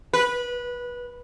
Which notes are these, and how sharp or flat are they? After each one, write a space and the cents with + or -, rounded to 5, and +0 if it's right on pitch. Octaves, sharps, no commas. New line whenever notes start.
B4 -20